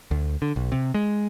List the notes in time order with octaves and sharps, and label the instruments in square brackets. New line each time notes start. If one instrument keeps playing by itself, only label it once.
[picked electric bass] D2
D3
B1
C3
G#3